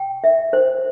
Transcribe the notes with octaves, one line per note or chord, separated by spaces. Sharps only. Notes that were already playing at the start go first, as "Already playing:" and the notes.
Already playing: G5
E5
C5